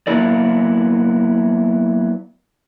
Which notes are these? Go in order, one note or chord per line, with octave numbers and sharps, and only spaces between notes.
F#3 A#3 B3 E4 A#4 D5